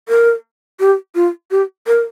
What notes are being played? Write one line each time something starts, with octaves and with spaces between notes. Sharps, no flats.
A#4
G4
F4
G4
A#4